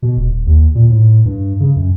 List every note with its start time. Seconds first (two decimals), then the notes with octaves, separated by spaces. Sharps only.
0.02 B2
0.17 D#1
0.46 D#2
0.75 A#2
0.90 A2
1.25 G2
1.60 C#3
1.76 F#2